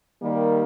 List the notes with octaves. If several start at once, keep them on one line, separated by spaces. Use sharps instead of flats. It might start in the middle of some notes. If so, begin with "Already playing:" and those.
D#3 G3 A#3